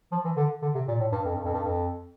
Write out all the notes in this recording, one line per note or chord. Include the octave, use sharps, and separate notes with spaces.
F3
E3
D3
D3
C3
A#2
A2
G2
F2
G2
F2
G2
F2